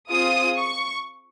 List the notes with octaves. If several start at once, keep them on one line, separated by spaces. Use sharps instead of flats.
C4 F4 G#4 D#6
C#6